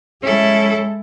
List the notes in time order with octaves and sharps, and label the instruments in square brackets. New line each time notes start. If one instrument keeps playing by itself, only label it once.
[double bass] G#3 [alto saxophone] C#4 [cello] E4 A4